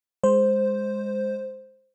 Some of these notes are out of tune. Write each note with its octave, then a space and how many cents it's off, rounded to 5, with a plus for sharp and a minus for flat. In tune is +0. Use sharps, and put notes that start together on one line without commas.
G#3 -10 C5 +0